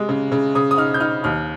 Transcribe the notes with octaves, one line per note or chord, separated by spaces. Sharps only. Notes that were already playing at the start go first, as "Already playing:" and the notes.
Already playing: C3 G#3
C#3
C#3
C#3 D#6
D#6
D#4 F6
G6
D#4 F6
D#2 F6